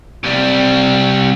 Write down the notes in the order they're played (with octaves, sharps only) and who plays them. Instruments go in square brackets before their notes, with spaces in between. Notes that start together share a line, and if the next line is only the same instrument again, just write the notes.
[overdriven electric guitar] C3 G3